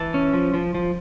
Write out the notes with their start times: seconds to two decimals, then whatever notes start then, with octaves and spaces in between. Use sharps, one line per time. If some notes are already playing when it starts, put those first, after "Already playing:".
Already playing: E3 A5
0.14 C#4
0.33 F3
0.54 F3
0.75 F3